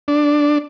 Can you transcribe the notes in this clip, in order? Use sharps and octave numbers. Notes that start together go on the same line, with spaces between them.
D4